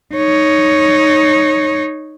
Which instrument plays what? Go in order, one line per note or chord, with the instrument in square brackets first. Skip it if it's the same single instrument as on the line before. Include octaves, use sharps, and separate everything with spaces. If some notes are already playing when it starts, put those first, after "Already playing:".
[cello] D#4 C#5